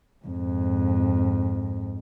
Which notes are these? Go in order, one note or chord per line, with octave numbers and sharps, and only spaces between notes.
F2 G#2